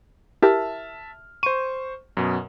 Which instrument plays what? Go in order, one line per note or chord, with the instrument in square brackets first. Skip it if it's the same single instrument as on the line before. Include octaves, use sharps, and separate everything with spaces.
[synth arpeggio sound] E4 G4 A#4 [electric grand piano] E5 A5 F6
[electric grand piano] C5 C#6 [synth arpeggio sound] D#7
[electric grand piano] F#2 B2